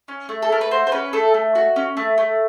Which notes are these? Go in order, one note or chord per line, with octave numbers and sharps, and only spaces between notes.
C#4
A3
A4
A3 A#4
B4
F#4 C5
C5
C#4 B4
A3 A4
A3
F#4
C#4
A3
A3